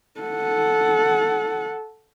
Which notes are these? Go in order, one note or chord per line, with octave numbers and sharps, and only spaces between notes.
A4 F#5